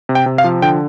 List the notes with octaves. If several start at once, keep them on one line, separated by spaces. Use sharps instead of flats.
C3
G5
C3
F5
F3
D3 G5